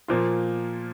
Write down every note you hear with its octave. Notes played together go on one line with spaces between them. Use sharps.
A#2 F3 A#3 F4